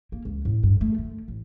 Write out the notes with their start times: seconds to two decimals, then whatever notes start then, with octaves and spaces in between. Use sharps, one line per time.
0.12 A#3
0.25 C#2
0.45 A2
0.63 G2
0.81 A3
0.98 D3
1.28 A1